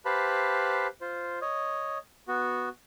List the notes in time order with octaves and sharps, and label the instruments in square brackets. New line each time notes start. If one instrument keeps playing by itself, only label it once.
[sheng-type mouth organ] G4 B4 C5 F5 A5 B5
F4 C5
C#5 D#5
B3 F#4